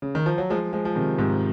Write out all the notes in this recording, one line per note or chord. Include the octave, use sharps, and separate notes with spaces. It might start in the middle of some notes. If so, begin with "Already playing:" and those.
C#3
D#3
F3
F#3
F3 G#3
F3 G#3
F3
C3 D#3
G#2 C3